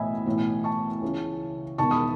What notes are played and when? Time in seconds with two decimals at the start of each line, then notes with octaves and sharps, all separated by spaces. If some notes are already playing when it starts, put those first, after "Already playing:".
Already playing: B1 A2 E3 D#5 E5 G#5 B5
0.26 B1 A2 E3
0.64 A5 C#6
1.02 C#2 C#3 E3
1.78 E1 E2 D#3 A5 C#6
1.91 B5 D#6